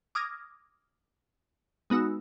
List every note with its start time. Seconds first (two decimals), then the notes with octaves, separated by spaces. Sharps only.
0.15 D6 D#6 F6 G#6 A#6
1.90 G#3 B3 D#4 F#4 E6